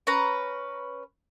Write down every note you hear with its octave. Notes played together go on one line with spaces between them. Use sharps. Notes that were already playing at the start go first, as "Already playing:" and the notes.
C#4 B4 A#5